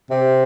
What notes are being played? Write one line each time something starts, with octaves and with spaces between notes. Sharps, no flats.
C3